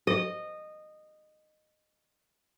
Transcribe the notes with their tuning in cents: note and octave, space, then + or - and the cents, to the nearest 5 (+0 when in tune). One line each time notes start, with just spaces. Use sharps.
D#5 -15